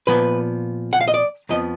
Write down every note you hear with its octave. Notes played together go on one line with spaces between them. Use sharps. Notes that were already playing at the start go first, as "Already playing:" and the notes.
A#2 F3 B3 B4
F#5
F5
D#5
D5
F2 F3 B3 D#5